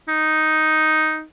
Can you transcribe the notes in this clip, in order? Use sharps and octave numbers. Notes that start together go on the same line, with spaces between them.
D#4